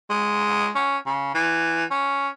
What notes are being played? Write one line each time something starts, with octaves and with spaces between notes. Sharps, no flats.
G#3
C#4
C#3
E3
C#4